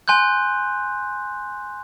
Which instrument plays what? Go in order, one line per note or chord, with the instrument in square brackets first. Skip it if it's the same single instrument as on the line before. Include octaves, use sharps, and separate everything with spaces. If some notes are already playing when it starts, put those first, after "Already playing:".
[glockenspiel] G#5 C6 F#6 G6